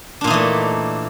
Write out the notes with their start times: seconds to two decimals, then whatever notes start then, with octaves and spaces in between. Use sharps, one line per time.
0.21 D4
0.24 A#2
0.27 D#4
0.30 E3
0.34 A3